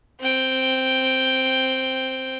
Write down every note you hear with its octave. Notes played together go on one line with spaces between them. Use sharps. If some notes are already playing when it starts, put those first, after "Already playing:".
C4 G5